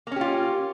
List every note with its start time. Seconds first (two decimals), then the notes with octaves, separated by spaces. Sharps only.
0.07 A#3
0.11 C#4
0.16 G4
0.21 F4